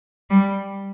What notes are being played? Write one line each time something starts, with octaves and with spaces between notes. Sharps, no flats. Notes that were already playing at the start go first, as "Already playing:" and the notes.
G3